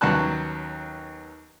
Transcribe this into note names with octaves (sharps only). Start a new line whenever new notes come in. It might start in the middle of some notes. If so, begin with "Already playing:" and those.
D#2 F#3 B3 C#4 A5 F#6